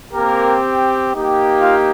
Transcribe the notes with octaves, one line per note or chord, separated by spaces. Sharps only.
A#3 C4 G4 A#4
A#3 D#4 G4
F4 F5